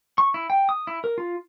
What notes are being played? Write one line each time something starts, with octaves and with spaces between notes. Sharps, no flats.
C#6
E4
G5
D#6
E4
A#4
F4